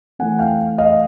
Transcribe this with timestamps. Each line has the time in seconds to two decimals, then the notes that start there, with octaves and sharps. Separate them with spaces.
0.19 E3 A3 C4 F#5 G#5
0.39 F5 G5
0.78 D#5 F5